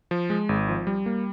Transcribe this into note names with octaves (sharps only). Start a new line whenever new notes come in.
F3
G#3
G#1
F3
G3
A#3